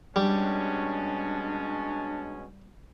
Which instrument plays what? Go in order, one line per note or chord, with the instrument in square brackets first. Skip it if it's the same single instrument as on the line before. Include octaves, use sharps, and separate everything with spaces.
[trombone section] B2 G#3 C#4 [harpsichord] G3 [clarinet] D4